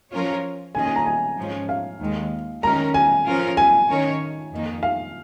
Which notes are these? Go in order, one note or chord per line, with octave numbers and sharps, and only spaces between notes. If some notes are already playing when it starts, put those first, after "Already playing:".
F3 C#4 F4 A#4 C#5
D#3 A#3 C#4 G#4 D#5 G#5
G#5
A#5
G#5
G#2 F3 G#3 C#4
F5
D#2 D#3 G#3
D#3 G#3 C#4 A#4 A#5
G#5
F3 C#4 F4 A#4
G#5
D#3 C#4 A#4 C#5
F2 D#3 A#3 D#4
F5